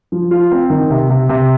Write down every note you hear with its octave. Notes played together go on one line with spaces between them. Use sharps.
F3
F4
C4
D#3
C3
C3
C3